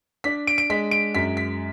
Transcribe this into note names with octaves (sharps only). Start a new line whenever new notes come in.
D4 B6
D7
D7
G#3 B6
D7
F#2 B6
B6